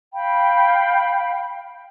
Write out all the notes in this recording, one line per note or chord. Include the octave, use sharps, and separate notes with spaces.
F5 G5 B5